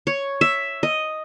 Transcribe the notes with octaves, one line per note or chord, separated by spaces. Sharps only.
C#5
E5
D#5